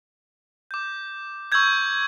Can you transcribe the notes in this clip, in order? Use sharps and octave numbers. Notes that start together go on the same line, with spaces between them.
D6 G6
C#6 E6 G6 G#6